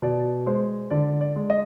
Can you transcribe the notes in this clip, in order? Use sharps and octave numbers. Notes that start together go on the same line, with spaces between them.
B2 D5
G#3 C5
D3 D5
D5
G#3
D#5